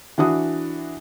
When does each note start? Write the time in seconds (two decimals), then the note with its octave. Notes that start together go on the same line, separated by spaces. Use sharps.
0.18 E3 D4 F#4 D#6